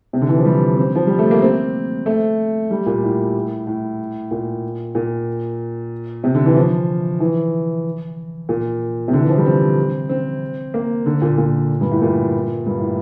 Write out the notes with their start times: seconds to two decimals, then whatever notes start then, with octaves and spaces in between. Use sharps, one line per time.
0.13 C3
0.21 D3
0.29 E3
0.38 F3
0.46 G3
0.77 C4
0.96 F3
1.07 G3
1.19 A3
1.31 A#3
1.42 C4
2.06 A3
2.71 G3
2.86 A#2
3.03 A2
3.67 A2
4.31 A#2
4.95 A#2
6.24 C3
6.35 D3
6.46 E3
6.56 F3
7.20 E3
8.49 A#2
9.08 C3
9.13 D3
9.21 E3
9.29 F3
9.37 G3
9.45 C4
10.09 C4
10.74 A#3
11.06 D3
11.22 A#2
11.38 A#2
11.81 G2
11.91 A2
12.02 A#2
12.66 G2
12.80 A2